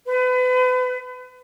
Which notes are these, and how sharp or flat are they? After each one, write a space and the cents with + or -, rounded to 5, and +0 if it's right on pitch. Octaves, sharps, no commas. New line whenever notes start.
B4 +35